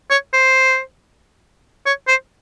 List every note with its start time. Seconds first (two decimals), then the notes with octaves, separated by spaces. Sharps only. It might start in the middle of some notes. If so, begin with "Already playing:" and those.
0.10 C#5
0.33 C5
1.86 C#5
2.08 C5